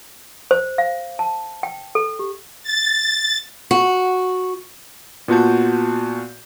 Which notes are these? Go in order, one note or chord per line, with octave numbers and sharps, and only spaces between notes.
C5
F5
A5
G5
A4
G4
A6
F#4
A#2 B3 F4 F#4 A5 G6